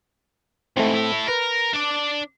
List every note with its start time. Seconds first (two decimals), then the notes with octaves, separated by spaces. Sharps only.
0.77 G#2 E3 A3 C4
0.94 E4 A4
1.28 A#4 B4
1.74 D4 D5